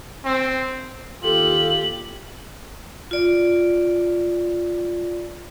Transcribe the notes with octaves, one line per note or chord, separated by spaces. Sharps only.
C4
D#2 F4 G4 A4 F#7
F4 D5